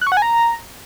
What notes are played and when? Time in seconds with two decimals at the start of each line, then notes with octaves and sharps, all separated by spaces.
0.01 F#6
0.07 C#6
0.12 F#5
0.17 G#5
0.22 A#5